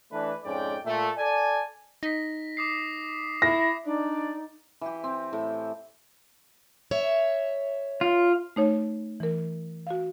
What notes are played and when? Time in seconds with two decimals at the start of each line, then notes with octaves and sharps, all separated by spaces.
0.12 E3 A3 D4 B4
0.44 F2 G#2 C#4 D5 G5
0.85 A#2 A3
1.17 A4 D5 G#5
2.03 D#4 A#6 B6
2.57 D6 D#6 C7
3.42 E4 A#6
3.86 D4 D#4 D5
4.81 E3 G4
5.04 C4
5.33 A2
6.91 C#5 E5
8.01 F4
8.56 A3 D#4 C#5
9.20 E3 A#4
9.87 F#4 F5